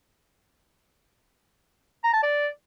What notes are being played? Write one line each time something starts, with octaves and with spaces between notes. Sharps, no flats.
A#5
A5
D5